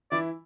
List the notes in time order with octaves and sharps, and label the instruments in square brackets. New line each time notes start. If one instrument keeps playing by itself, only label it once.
[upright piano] E3 E4 [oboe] D5